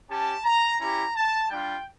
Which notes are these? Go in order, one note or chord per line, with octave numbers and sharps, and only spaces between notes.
C#4 G4 A5
A#5
C#4 E4 G4 A#5
A5
G3 D4 F4 G5